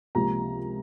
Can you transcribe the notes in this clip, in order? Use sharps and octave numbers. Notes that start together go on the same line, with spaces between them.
C#2 C3 F3 A#3 A#5